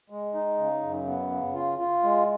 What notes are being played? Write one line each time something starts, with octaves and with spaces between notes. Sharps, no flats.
G#3
D#4
C#3
F#2
B3
C#3
F4
F4
G#3